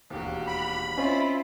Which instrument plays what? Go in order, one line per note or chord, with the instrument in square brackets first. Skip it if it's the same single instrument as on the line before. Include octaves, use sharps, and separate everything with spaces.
[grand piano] E1 D#2 [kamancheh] F#4 G4
[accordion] B5
[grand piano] C4 D5 D#5 [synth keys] C#4 [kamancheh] E4 F4